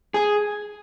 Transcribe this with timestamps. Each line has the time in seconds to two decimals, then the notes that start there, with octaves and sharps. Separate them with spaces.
0.14 G#4